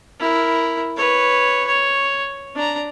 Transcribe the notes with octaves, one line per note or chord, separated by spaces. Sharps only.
E4 A#4
B4 C#5
C#5
D4 A#5